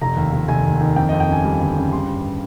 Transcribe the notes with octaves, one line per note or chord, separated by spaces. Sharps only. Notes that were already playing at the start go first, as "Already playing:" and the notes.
F1 A#5
D#2
F1
F1 G#5
D#2
D#3
F2 G5
F2 D#5
G5
C#3 G#5
G3 G#5
G1
C#3
G3 C6
G2